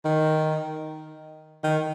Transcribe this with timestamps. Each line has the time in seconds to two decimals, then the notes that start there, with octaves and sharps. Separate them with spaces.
0.05 D#3
1.64 D#3